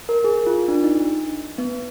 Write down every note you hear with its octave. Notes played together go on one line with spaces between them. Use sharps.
A#4
G#4
F4
D4
D#4
B3